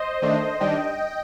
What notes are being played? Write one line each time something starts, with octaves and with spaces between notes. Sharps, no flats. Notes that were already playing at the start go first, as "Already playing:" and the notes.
Already playing: C5 D#5
D#3 A3 D4
D#3 G3 D4 D#5 G5